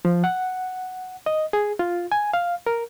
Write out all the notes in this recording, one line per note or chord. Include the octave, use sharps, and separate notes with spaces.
F3
F#5
D#5
G#4
F4
G#5
F5
A#4